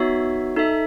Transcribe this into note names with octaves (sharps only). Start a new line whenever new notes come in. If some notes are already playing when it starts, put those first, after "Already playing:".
Already playing: B3 D#4 F#4 C#5 E5
D#4 A4 E5